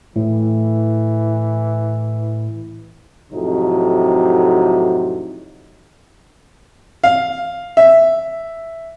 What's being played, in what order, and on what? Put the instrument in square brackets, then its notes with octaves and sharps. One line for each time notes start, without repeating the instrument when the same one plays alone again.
[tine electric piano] A2 [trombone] E3
[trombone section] F2 A2 C3 F#3 D#4
[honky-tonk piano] F5
E5